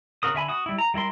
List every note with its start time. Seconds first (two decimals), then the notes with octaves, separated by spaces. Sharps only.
0.23 C#3 F#4 A#4 D#6
0.34 D3 E5 G#5 B5
0.48 F#4 D#6
0.66 G3 E4
0.78 A#5
0.94 G3 E4 A#4 C6